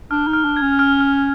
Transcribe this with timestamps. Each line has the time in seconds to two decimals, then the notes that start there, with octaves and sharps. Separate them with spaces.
0.11 D4 F6
0.27 D#4
0.33 F6
0.44 D4
0.56 C#4 G#6
0.79 F6
1.01 F6